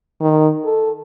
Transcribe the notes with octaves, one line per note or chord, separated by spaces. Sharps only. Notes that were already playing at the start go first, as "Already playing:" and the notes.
D#3
A4